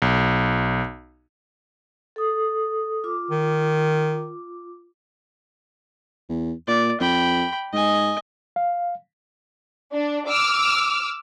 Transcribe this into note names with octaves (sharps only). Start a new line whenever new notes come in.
B1
A4 D#6
F4 D6
D#3
E2
A#2 D5
F2 G5 B5
G#2 D#5 G#5
F5
D4
D6 E6 F6